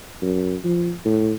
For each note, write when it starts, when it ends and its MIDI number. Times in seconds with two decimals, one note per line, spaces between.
0.22 0.55 42
0.64 0.92 53
1.05 1.32 45